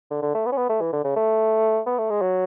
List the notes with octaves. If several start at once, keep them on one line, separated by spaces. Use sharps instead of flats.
D3
D3
A3
B3
C#4
B3
A3
E3
D3
C#3
A3
B3
A3
G#3
F#3